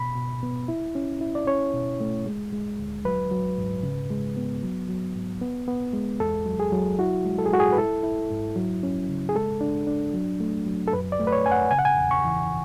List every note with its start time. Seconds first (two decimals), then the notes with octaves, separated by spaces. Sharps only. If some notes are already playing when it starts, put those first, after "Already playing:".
Already playing: B2 B5
0.15 B2
0.43 B3
0.68 E4
0.95 C#4
1.21 E4
1.35 D5
1.47 C#4 C#5
1.74 B2
2.00 A3
2.26 G#3
2.53 G#3
2.79 D2
3.05 F#3 B4
3.31 F#3
3.58 G#2
3.83 C#3
4.10 G#3
4.37 B3
4.63 F#3
4.89 F#3
5.15 G#2
5.41 B3
5.68 B3
5.93 G#3
6.20 E2 A4
6.46 F#3
6.60 G#4
6.72 F#3
6.99 E4 F#4
7.25 G#3
7.39 A4
7.46 G#4
7.52 G#3 F#4
7.60 G#4
7.73 B4
7.78 E4 A4
8.03 E4
8.30 G#2
8.56 F#3
8.83 C#4
9.09 C#3
9.29 G#4
9.35 G#3 A4
9.61 D4
9.87 D4
10.14 F#3
10.40 A3
10.66 F#3
10.88 A4
10.93 F#2 B4
11.12 D5
11.19 A3
11.27 B4
11.32 C#5
11.45 F#2 G#5
11.52 F#5
11.71 C#3 G#5
11.79 F#5
11.85 G#5
11.98 E2
12.11 C#6
12.25 E3